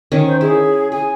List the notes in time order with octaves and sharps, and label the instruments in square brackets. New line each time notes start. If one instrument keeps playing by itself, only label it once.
[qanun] D#3 C#4
[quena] C5
[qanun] E4 [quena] G#4
[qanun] G#4 [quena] G#5